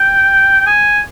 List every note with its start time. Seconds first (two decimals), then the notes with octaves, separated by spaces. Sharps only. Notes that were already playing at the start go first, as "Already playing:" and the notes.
Already playing: G5
0.60 G5
0.66 G#5